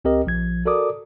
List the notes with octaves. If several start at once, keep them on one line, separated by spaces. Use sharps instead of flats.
C#2 C4 G4 A#4 D#5
A#1 F3 G#6
F#4 A4 A#4 D5 D6 D#6